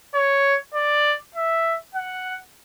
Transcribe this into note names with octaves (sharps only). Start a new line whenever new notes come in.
C#5
D5
E5
F#5